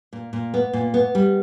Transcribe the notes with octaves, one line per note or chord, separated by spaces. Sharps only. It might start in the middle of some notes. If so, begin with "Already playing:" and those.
A#2
A#2
B3
A#2
B3
G3